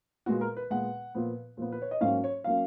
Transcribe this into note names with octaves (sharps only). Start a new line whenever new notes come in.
A#2 G#3 B3 F#4
A#4
B4
A#2 G#3 B3 F#5
A#2 F3 B3
A#2 F3 B3
B4
C#5
D#5
G#2 F#3 A#3 C#4 F5
C#5
F#3 A#3 C#4 F5